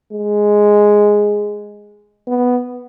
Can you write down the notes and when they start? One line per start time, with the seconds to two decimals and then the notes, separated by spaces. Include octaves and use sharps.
0.12 G#3
2.28 B3